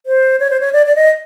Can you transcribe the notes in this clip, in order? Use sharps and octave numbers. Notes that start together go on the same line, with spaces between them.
C5
C#5
C5
C#5
D5
D5
D#5